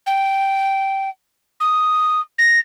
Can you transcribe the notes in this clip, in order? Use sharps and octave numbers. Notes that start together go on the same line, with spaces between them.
G5
D#6
A#6